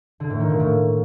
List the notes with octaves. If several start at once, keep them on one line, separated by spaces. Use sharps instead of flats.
D3
A2
D#3
A#2
A2